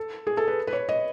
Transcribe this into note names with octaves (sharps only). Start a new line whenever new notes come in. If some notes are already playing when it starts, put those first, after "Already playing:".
Already playing: A4
G#4
A4
B4
B4
C#5
D#5